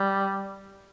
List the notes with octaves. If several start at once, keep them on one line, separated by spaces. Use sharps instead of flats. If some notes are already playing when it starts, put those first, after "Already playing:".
Already playing: G3